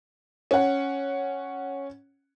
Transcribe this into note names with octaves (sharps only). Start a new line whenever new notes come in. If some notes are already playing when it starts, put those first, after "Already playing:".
C#4 F#5